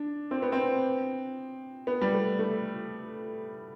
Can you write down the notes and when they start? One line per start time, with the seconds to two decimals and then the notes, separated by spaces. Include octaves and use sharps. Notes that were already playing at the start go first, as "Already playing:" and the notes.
Already playing: D4
0.31 C4
0.42 B3
0.52 C4
1.87 B3
2.01 G3
2.14 A3
2.39 A3